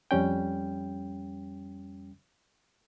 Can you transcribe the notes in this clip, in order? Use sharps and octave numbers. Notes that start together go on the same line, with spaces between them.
F2 G3 C#4 G5